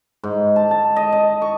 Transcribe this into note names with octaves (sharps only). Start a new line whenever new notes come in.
G#2
A5
A5
D#5
D#5
C#6